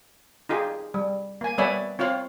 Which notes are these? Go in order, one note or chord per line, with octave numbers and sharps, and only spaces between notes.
D#4 F4 G4 G#4
G3
A#3 G#5
G3 B3 C#5 D5 E5 G#5
C4 F4 C#5 F5